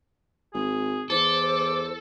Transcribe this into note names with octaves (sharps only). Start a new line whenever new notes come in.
G#1 G#4
E2 A4 C5 D6